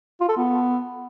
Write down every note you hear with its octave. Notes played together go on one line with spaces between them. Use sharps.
F4
A4
B3